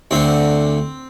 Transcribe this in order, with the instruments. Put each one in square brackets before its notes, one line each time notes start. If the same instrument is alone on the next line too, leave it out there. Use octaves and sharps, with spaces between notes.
[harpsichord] D2 D3 C4